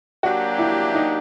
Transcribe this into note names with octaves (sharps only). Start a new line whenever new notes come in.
F#3 A#3 D4 F#4 G4
E4
D#4